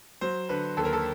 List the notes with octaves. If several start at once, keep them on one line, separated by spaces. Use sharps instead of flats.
F#3 C5
D3 B4
D#2 A4
A#4
A4